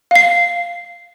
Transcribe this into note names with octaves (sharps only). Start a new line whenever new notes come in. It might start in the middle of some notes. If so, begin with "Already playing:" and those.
F5 C7